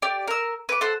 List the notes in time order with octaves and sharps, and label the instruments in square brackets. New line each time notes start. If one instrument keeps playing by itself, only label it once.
[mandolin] G4 D5
A#4 E6
B4 D6
A4 C5 F#5